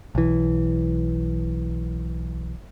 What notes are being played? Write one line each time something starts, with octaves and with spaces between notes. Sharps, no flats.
B1 E3